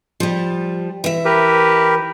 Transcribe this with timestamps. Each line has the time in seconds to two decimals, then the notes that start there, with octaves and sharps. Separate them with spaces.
0.20 F3 G3
1.04 E3 E5
1.25 G4 A#4 B4